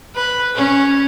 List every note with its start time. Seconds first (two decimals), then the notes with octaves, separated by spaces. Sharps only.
0.16 B4
0.55 C#4